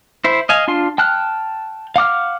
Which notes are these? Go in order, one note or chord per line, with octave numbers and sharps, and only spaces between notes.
E4 C5 E5
D#5 F5 G#5
D4 F4 C6
G5 A5 F6 F#6
F5 F#5 D6 F6